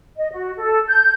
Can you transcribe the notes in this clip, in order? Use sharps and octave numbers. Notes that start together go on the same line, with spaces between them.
D#5
F#4
A4
G6